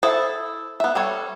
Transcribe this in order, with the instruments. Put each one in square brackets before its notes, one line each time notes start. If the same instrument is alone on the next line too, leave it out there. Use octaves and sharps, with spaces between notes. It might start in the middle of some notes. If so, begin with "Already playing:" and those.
[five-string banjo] E4 A4 [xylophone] C5 D#6
[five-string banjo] B3 E5
G3 A4 C#5